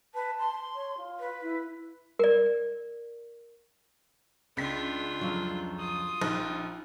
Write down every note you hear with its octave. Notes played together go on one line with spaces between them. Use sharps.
B4 A5
C6
C#5
F4
B4
E4
A#4 D5
C#2 D4 F4 B6
F2 F3 F#3
F4 D#6
A#1 D#4 F#6